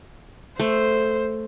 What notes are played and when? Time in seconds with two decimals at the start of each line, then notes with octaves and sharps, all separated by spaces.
0.60 A3 C5